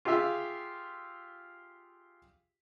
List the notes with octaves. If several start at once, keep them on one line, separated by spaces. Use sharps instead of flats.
F4 G4 G#4 E5 F5